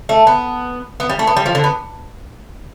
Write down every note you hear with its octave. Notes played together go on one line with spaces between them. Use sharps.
A3
B3
B3
G3
A3
B3
G3
F3
D3
B3